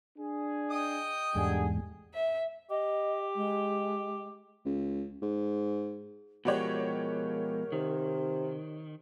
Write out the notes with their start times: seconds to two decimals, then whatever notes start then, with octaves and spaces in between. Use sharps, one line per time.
0.18 D4 G#4
0.70 D#5 G5 D#6
1.35 E2 G#2 D3 G3 G#4
2.14 E5
2.70 G4 D#5
3.36 G#3
4.65 C#2
5.22 G#2
6.45 B2 F3 G#3 F#4 G4 A#4 C#5
7.72 C3 D#3